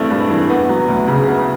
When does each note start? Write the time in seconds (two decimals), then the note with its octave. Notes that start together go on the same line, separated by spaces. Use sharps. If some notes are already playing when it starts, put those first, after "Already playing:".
Already playing: G2 E3 A3 C4
0.10 G2
0.30 E3
0.49 B3
0.69 F#3
0.88 D2
1.08 C#3
1.27 B3